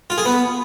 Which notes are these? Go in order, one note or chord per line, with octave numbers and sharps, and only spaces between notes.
F4
G#4
B3